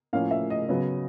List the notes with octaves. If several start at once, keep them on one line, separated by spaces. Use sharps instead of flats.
A2 F3 A#3 C#4 F5
E5
D#5
C#3 F#3 B3